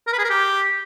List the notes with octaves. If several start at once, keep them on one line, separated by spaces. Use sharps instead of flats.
A#4
B4
G#4
A#4
G4